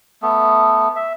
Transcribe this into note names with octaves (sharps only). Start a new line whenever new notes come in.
A3 B3
E5